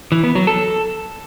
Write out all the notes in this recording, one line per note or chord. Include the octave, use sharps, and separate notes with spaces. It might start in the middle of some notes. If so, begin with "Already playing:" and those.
E3
B3
F#3
A4